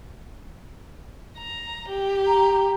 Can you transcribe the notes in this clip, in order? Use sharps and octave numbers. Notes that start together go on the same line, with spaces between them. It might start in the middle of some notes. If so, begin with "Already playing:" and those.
A#5
G4
A#5